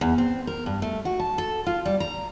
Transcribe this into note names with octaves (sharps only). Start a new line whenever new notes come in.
E2
C4
A#4
G2
A3
F#4
A5
A4
F4
G3
A#5